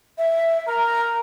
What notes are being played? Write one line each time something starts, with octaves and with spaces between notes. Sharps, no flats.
E5
A#4 A#5